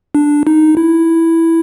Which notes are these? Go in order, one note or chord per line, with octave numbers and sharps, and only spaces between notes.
D4
D#4
E4